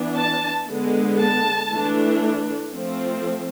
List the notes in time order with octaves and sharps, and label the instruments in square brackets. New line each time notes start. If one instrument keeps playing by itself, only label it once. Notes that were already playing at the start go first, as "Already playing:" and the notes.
Already playing: [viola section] E3 B3 D4
A5
D3 G#3 B3
A5
E3 A3 D4
F3 A3 C4